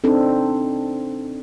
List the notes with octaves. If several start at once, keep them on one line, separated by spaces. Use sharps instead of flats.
C4 D4 D#4 A4